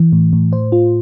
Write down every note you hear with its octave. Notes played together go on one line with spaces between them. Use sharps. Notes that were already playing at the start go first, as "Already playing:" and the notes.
Already playing: E3
A2
A2
C5
F4